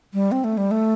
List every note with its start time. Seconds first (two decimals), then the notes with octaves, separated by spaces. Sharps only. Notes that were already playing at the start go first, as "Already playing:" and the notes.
0.14 G3
0.32 C4
0.44 A3
0.58 G3
0.71 A3